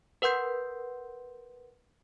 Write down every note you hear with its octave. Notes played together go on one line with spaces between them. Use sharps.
A#4 B4 F#5 C6 G6 C7